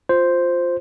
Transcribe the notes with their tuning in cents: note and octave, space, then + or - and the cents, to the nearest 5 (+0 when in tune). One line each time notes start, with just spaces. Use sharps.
F4 +10 C5 +0